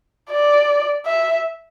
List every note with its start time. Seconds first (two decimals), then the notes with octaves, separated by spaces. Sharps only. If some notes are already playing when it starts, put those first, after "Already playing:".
0.30 D5
1.06 E5